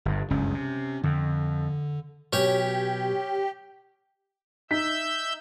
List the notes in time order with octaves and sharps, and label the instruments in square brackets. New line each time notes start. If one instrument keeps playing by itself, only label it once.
[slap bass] G1 G2
[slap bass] F#1 C#2 G2 [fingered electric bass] C#4
[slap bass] C3
[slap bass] F2 [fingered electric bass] D3
[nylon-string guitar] B2 F#3 [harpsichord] C#4 C#5 [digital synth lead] G4
[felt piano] D#4 B6 [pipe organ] E5 E6 G6